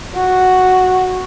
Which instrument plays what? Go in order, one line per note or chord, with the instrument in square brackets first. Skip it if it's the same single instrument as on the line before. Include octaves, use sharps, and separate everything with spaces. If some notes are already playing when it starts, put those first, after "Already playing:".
[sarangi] F#4